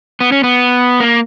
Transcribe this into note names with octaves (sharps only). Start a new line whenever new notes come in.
B3
C#4
B3
A#3